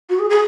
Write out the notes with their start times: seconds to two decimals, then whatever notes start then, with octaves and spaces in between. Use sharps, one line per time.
0.09 F#4
0.19 G#4
0.30 G#4